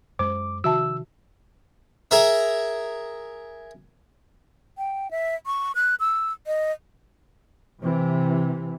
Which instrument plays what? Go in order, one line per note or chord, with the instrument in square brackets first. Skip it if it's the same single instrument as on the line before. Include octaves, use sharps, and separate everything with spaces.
[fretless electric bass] F#2 G#3 [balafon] C5 [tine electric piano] D6
[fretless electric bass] C3 D#3 F3 [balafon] F#4 E5 A5 [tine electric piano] E6
[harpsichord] G#4 A#4 E5
[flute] G5
E5
C#6
F#6
E6
D#5
[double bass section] C3 E3